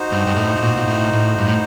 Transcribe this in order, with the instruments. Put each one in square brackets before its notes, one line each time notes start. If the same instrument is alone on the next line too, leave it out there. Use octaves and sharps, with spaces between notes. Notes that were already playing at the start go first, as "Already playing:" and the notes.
Already playing: [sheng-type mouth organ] D#4 F#4 C5
[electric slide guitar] G2
G2
A2
A2
A#2
A#2
A2
A2
G2
A2